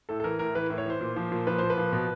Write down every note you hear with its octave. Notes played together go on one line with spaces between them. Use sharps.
A2 A4
A4
E3 A#4
A2 A#4
E3 B4
A2
C#5
E3 C5
A#2
F3
A#2
F3 B4
A#2 C5
B4
F3
B2